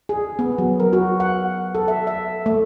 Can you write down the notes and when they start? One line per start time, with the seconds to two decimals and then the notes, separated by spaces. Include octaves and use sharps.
0.09 G#4
0.39 B3
0.58 F#3
0.80 A#4
0.93 F#4
1.20 F#5
1.75 A4
1.88 E5
2.07 E5
2.46 A3